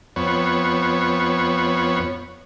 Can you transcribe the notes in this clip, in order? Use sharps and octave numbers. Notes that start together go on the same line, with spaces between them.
F2 B3 C#5